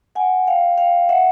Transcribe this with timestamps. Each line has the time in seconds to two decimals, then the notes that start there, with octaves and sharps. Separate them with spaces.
0.15 F#5 G#5
0.47 F5 G5
0.78 F5 G5
1.09 E5 F#5